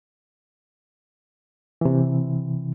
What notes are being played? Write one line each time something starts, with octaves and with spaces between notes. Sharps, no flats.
C3 E3